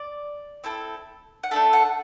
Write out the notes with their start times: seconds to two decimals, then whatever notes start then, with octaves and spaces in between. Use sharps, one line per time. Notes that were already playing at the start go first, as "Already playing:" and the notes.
Already playing: D5
0.64 C4 E4 A4
1.43 F#5
1.51 A3 D4 A4 E5
1.73 F#5